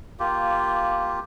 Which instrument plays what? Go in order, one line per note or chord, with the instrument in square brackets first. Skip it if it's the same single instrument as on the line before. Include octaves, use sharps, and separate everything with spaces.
[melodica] A#3 F4 G4